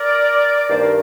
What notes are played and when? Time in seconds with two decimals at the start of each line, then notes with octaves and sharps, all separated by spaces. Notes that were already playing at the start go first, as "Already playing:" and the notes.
Already playing: A#4 D5
0.69 G2 D#3 A#3 C5
0.80 A#4